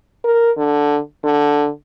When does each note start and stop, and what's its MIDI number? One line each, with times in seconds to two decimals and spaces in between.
0.24 0.51 70
0.57 0.99 50
1.24 1.69 50